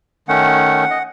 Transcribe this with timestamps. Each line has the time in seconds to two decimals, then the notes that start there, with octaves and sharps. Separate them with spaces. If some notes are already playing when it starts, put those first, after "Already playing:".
0.28 D#3 A3 C#4 F#5
0.90 D#5